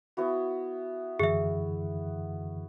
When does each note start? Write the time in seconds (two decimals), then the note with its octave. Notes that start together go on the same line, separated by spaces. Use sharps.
0.17 B3 E4 F#4
1.20 F#2 D3 E3 G#4 E5